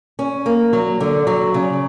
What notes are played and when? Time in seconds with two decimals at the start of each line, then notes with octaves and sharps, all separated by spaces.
0.19 C#4
0.46 A#3
0.73 F#3
1.00 D3
1.27 F#3
1.54 C#3